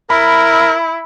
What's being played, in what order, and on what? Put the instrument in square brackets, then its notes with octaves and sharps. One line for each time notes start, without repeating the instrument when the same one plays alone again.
[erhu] E4 [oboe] A#4 [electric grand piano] B5